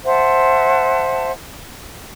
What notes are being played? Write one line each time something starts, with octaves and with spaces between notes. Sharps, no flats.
C5 E5 F#5 A5